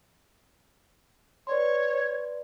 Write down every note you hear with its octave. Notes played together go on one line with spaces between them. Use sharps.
B4 C#5 D5 C6